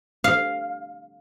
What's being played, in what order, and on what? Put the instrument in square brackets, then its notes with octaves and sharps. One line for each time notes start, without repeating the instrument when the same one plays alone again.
[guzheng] F5